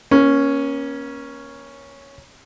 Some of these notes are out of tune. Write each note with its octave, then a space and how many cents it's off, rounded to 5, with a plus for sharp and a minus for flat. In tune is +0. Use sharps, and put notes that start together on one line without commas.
A#3 +35 C#4 +0